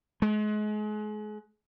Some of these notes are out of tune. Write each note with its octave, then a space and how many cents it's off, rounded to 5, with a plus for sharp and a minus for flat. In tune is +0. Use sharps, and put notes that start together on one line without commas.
G#3 +35